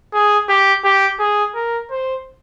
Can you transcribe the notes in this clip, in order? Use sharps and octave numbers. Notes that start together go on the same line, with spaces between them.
G#4
G4
G4
G#4
A#4
C5